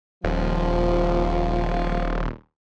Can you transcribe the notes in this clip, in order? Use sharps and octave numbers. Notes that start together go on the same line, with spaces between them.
D#1 F3